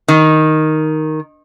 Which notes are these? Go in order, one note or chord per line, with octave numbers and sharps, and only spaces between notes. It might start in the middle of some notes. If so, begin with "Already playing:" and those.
D#3